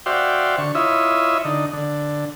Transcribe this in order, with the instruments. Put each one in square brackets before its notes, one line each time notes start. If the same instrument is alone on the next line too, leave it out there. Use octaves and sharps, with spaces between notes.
[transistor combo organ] F#4 C5 D5 E5 F5 G5
D3 C#6
E4 F4 C#5 D#5 E5
D3 D#4
D3